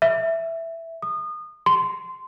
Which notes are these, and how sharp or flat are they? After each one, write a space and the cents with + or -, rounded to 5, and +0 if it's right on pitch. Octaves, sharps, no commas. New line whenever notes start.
E5 +0
D#6 -30
C6 -20